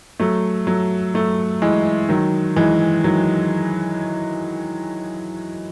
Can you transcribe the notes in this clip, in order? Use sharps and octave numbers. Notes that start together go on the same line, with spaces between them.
F#3 A3
F#3 A3
F#3 A3
E3 G#3
D#3 F#3
E3 G#3
D#3 F#3